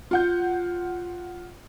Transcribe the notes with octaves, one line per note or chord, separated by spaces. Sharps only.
F4 F#5 G6